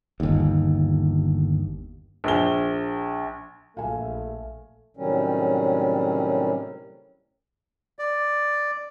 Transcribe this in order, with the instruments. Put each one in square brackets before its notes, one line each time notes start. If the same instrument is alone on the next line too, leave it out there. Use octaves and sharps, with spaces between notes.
[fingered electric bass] G1 D#2
[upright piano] A#1 G7
[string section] A#1 [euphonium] A3 [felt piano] F5 G#5
[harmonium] A2 C3 D#3 F#3 G3 C#4
[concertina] D5